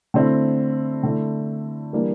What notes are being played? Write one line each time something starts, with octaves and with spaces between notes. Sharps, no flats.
D3 A3 C4 E4
D3 A3 E4
E3 G3 A#3 D4